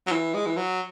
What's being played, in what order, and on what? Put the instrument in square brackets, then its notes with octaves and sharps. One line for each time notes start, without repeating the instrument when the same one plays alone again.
[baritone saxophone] F#3
E3
G#3
E3
F#3